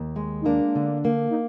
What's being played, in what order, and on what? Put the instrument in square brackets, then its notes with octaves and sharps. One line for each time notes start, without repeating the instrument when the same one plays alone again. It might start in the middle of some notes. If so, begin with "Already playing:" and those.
Already playing: [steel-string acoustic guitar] D#2
G#3
[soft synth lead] D#4
[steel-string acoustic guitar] A#3 [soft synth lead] D4
[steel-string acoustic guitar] D3
A#3
[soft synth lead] D#4